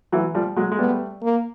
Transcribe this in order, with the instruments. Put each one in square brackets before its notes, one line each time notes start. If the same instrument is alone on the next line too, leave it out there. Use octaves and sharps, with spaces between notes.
[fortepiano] E3 F#3
F3 G3
F#3 G#3
G#3
[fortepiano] G3 A3 [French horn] B3
[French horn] A#3